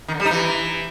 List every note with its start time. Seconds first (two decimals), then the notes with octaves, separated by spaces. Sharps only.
0.08 D#3
0.14 D3
0.20 G3
0.25 D#4
0.31 E3